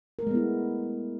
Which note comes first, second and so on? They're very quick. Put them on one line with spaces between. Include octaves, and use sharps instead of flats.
A#4 A3 G#3 B3 E4